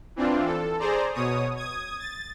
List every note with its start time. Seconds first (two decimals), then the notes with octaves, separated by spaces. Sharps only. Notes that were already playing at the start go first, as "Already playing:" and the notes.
0.16 E3 C4 D4 F4
0.45 A4
0.79 G#4 C5 D5 A#5
1.14 B2 C#5 D#6
1.56 D#6 G#6
1.99 A6